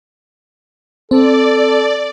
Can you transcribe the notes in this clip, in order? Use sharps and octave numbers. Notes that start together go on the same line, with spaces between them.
C4 A4 D5